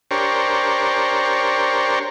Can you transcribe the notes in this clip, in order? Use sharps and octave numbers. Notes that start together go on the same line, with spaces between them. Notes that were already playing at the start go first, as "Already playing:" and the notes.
D4 G4 A#4 C5 C#5